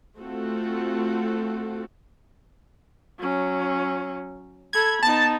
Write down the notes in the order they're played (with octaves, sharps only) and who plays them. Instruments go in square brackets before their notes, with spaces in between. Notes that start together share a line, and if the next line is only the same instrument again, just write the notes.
[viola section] A3 C4 F4 F#4 A4
[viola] F#3 C#4
[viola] A4 B5 [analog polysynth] G#6
[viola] B3 D#4 [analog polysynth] A5